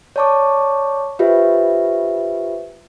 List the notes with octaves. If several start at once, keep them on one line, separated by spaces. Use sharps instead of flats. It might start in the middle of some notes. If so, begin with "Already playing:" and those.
C#5 D5 A5 C#6 D6
F4 G4 B4 C5 D#5 E5